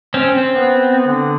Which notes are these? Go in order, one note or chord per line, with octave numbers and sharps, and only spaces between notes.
C4 C#4
C4
B3
D3